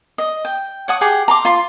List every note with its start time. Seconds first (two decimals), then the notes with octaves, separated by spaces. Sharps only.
0.18 D#5
0.45 G5
0.88 C#5 F#5 D#6
1.01 G4 G#4 F#5 G5
1.28 A#5 C6 D6
1.45 F4 C6